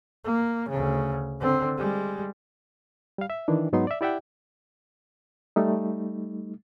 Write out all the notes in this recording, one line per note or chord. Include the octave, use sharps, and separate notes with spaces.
A#3
D2 C#3
D3 C4
G3 G#3
G3 F5
E5
D#3 E3 D4
G#2 F#3 B3 D#4 C6
D5 E5
E4 G4 D5 E5 F#5 G5
G3 A3 D#4